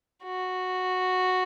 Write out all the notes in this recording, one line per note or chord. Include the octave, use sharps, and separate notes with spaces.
F#4